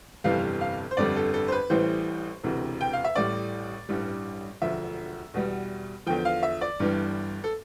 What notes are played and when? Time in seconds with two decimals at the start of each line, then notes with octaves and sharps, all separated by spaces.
0.24 G1 F2 C3 E3 G3 F5
0.61 F5
0.91 C5
0.97 G1 F2 D3 G3 D5
1.16 A4
1.34 A4
1.48 C5
1.52 B4
1.70 A1 A2 E3 G3 C5
2.43 E1 D2 C3 E3
2.81 G5
2.93 F5
3.04 E5
3.15 A1 A2 G3 D5
3.89 A1 G2 E3 G3
4.62 E1 D2 D3 F3 E5
5.34 E2 B2 G3
6.06 E2 D3 F3 G5
6.25 F5
6.43 E5
6.61 D5
6.79 G1 G2 E3 G3
7.44 A4